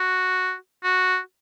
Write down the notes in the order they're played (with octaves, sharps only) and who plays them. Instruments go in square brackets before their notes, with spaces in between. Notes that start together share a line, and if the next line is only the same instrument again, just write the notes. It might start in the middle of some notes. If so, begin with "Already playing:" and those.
Already playing: [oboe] F#4
F#4